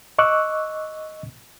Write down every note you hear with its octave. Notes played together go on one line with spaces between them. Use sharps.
D#5 C#6 D6 E6 F#6